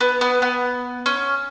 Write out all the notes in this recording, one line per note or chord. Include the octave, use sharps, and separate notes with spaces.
B3
B3
B3
C#4